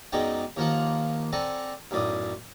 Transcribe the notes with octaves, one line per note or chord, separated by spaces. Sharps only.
F#2 G#3 B3 D#4 D5 G5
D#2 F3 A#3 F4 F#5
C4 A4 D5 F#5 G#5 A#5
B1 F#2 A2 D5 D#6